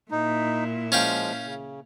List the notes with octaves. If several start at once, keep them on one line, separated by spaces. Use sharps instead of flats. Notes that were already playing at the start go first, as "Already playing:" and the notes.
A#2 D#4 E4
F3 G#3 C#4 F5 G5
C#3